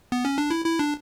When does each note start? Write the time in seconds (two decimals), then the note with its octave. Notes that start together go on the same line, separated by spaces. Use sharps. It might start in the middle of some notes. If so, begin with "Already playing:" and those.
0.12 B3
0.25 C#4
0.38 D4
0.51 E4
0.66 E4
0.79 D4